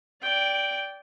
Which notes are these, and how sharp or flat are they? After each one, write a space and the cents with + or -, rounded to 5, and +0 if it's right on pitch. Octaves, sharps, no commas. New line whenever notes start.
D5 -15 G5 +0